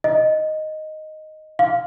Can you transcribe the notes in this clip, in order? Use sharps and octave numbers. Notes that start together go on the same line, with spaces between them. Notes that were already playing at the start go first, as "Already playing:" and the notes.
D#5
F5